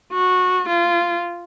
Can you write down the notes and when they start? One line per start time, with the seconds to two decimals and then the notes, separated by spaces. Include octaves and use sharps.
0.12 F#4
0.68 F4